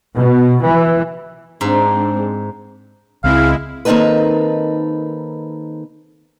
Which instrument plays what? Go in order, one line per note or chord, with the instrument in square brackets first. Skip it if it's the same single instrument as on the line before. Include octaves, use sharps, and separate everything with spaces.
[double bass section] B2
E3
[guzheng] G#2 [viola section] G#3 C4 D4
[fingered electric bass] C#2 C4 [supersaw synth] G#3 E4 [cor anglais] F5
[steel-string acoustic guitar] D#3 A#3 C4 D#4 A4 B4